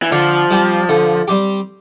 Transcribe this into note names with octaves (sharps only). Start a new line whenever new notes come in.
E3
D3 F3
G3 C4 G4
D3
G3 C4 G4